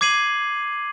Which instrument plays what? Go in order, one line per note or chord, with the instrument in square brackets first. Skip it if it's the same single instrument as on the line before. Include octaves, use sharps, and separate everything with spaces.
[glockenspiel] D6 G#6 C7 D#7 F#7